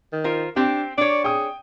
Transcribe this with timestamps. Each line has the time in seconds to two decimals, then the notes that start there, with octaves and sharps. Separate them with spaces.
0.12 D#3
0.24 F4 A#4 C5
0.56 C4 D4 G4 G5
0.98 D4 C#5 D5
1.24 G#4 G5 D#6